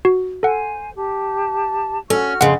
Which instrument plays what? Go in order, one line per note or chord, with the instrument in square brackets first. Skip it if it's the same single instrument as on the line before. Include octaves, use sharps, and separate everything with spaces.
[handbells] F#4
[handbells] A4 F#5 [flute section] C5 G#5
[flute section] G4 A5
[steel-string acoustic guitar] C#4 [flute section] F#4 C#6 F6 [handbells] A4
[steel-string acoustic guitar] F2 C#3 [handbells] F#5 [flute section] C6